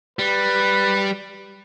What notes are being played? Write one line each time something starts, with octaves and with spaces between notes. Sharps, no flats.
G3 B4